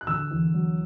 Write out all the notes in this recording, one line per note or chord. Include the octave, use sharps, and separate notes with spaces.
F#6
D3 E6
E2
F#3